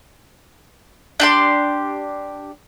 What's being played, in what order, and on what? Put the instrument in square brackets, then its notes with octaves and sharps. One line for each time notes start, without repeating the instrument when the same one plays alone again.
[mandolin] D4 G4 C6